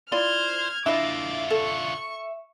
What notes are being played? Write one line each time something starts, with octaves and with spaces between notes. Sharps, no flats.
E4 F4 C5 D5 F6 G#6
D3 D4 E4 F4 D#5 E5 D6
A4 C#6